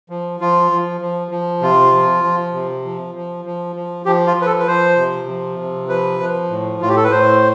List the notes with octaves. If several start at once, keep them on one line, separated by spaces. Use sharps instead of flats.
F3
F3 F4
F3
F3
F3
C3 F4
F3
F3
C3
F3
F3
F3
F3
F3 G4
F4
F3
B4
A4
B4
F3 C5
C3
F3
C3
F3 B4
F3
A2
A2 F4
G4
A4
B4
A2 C5